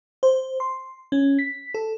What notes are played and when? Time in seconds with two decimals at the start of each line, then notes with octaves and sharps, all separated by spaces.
0.23 C5
0.60 C6
1.12 C#4
1.39 B6
1.74 A4